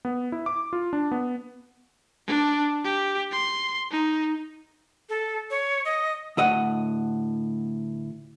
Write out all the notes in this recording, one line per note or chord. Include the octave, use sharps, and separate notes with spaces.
B3
E4
D6
F4
D4
B3
D4
G4
C6
D#4
A4
C#5
D#5
D2 A2 D#5 F#5